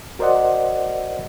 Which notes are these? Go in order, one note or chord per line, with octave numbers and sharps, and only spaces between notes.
F#4 A#4 C5 D5 D#5 F#5